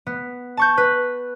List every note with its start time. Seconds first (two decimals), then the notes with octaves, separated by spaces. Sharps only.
0.06 B3
0.57 A5 C#6 G6
0.77 B4